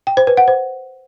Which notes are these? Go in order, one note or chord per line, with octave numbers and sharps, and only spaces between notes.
G5
C5
B4
F#5
C5